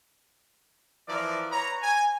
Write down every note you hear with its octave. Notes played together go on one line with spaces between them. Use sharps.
E3 F3 A#4 D5
B4 C#5 A#5
G#5